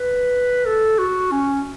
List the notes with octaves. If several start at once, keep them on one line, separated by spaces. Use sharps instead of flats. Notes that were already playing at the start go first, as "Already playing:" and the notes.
Already playing: B4
A4
F#4
C#4